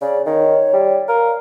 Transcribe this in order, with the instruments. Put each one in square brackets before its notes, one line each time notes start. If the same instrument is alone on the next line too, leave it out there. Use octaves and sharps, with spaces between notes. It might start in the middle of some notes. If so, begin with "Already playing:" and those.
[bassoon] C#3 [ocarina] D5
[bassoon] D#3 [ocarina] C#5
[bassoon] G3
[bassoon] A#4 [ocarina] F5